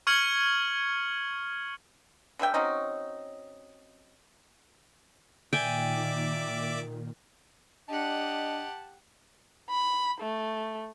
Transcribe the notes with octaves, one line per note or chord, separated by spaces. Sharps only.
C#6 F6 G#6 C#7 F#7
D3 G3 E5 G5
F#3 C4 C#4 D#4
A#2 D#3 D5 E5 G5 G#5 D6
D4 G4 D#5 F#5 A5
B5
A3